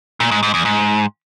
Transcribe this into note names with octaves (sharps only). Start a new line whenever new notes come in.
A#2
G#2
G#2
E2
G#2